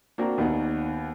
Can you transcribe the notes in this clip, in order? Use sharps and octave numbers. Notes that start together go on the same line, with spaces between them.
A#3 C4 D4 F#4 A#5
D#2 B3 D#4 F#5